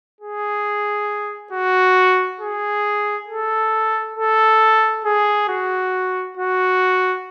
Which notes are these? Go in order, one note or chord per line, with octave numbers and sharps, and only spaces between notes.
G#4
F#4
G#4
A4
A4
G#4
F#4
F#4